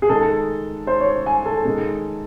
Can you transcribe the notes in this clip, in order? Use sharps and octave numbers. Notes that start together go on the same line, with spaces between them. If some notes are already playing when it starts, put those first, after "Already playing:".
G#4
D#3 G#3 A4
C5
C#5
G#5
A4
D#3 G#3